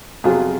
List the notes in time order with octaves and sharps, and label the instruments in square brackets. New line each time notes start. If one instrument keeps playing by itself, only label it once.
[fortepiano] F2 C3 F#3 F4 G#4